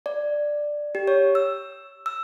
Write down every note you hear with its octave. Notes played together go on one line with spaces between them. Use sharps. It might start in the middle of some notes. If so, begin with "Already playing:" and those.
D5
G4
C#5
E6
E6